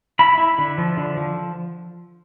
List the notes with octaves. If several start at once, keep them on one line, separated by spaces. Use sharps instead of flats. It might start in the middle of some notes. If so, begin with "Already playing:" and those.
E4 B5
E4
D3
F3
D3
F3